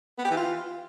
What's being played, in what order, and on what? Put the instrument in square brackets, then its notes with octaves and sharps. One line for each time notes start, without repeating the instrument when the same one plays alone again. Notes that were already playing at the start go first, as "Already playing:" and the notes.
[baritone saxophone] B3
G4
E3
F4